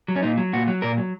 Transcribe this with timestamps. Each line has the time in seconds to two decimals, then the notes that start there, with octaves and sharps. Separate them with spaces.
0.08 F#3
0.16 C#4
0.23 A#2 D#4
0.37 F#3
0.53 A#2 F#4
0.68 F#3
0.82 A#2 A#4
0.97 F#3